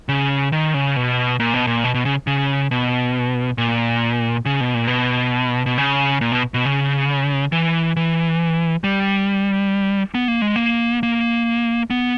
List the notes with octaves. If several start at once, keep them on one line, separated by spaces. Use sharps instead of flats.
C#3
D#3
C#3
B2
A#2
B2
A#2
B2
B2
C#3
C#3
B2
A#2
C#3
B2
A#2
B2
B2
C#3
A#2
B2
B2
C#3
E3
E3
G3
B3
A#3
G#3
A#3
A#3
B3